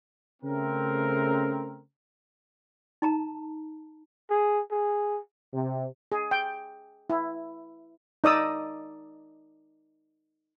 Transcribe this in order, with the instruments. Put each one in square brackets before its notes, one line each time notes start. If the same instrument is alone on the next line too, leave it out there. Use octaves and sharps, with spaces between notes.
[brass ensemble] C#3 A3 C4 A#4
[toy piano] D#4 A5 A#5
[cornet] G#4
G#4
[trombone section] C3
[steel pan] G#4
G5
E4
D#4 D5 D#6 E6